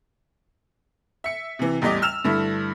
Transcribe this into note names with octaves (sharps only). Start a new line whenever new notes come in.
E5 C#7
C3 E3
A1 E2 G3 D#5 D6
E6 F6 E7 F7
G2 D3 A3 E4